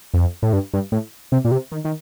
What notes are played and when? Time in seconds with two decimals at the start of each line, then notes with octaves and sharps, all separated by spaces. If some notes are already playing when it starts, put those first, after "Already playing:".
0.14 F2
0.43 A2
0.53 G2
0.74 G2
0.92 A2
1.32 C3
1.45 A#2
1.51 C3
1.72 D#3
1.85 D#3